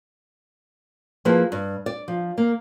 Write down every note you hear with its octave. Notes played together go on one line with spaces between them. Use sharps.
F3 A#3 E4 G#4 B4 A5
G2
D5
F3
A#3